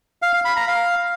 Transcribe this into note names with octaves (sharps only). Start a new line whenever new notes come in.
F5
F5
B5
A#5
F5